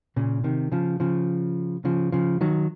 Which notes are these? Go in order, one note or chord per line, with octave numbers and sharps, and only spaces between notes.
A#2 C#3
C3 D#3
C#3 F3
C#3 F3
C#3 F3
C#3 F3
D#3 F#3